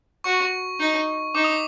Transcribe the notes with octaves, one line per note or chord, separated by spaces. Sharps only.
F#4 C#6
D#4
D#4 D6
D#6